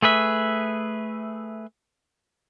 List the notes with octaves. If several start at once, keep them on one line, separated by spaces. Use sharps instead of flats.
A3 G#4 B4 E5